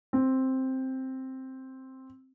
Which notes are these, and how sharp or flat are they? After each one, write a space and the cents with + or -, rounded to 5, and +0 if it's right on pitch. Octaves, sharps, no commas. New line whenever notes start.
C4 +5